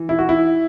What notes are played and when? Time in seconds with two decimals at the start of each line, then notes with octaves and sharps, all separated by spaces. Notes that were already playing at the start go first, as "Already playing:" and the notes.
Already playing: E3
0.09 E4
0.19 F#4
0.29 E4